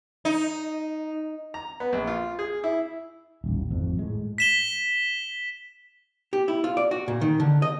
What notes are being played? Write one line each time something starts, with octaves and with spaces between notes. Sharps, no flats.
D#4
A#5
B3
A#1
F4
G#4
E4
D#1 A1
G#1 F2
A2 G#3
B6 E7 G7
G4
E4
F4
D5
F#4
A#2
D#3
D3
D#5